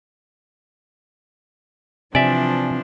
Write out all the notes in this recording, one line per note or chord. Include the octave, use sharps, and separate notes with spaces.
C3 E3 F3 D4 D5 E5 G#5